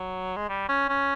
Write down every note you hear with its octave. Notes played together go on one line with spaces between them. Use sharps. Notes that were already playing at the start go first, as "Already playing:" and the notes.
Already playing: F#3
G#3
G3
C#4
C#4